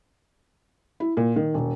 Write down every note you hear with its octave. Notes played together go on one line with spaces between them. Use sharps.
E4
A#2
D#3
E1